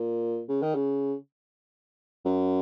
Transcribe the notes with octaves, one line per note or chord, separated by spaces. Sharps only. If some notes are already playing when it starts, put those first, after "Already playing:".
Already playing: A#2
C#3
D#3
C#3
F#2